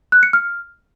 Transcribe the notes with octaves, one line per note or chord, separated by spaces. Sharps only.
F#6
C#7
F6